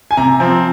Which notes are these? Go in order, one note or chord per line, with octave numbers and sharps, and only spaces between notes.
G#5
C3 A#5
F3 C4